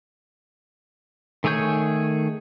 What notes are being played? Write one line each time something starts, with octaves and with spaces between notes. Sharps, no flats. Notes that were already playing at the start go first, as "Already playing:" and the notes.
D#3 A3 G#4 C#5 G6